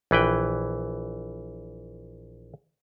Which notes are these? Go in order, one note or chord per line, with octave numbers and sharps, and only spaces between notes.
A#1 E3 B4 G5